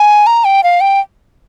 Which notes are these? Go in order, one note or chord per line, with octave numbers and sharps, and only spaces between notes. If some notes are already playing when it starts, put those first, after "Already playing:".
Already playing: G#5
A#5
G5
F5
G5